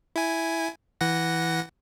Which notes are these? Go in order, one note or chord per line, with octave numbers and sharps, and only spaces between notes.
E4 G#5
E3 F#5 A#6